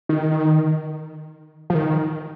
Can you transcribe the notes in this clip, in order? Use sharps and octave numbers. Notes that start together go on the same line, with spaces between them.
D#3
F3
D#3